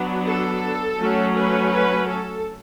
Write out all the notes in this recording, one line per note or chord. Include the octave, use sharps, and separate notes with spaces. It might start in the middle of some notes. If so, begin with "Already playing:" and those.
Already playing: F#3 B3 D4
A4
F#3 A3 C#4
B4
B4
A4